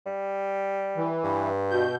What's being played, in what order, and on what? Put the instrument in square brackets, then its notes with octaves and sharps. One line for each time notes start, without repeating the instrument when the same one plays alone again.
[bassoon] G3
[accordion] E3
[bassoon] G2
[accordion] B2 G6